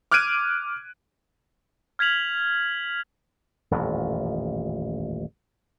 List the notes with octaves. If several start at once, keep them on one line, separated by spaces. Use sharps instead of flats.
D6 F6 F#6 G#6 D7 D#7
F6 G#6 B6 F7 F#7
D#1 A1 F2